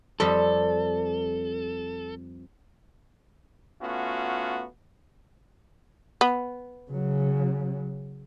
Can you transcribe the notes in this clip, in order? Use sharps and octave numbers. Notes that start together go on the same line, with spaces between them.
F2 G3 C4 A4
A3 B3 C#4 F4 F#4
B3
C#3 F#3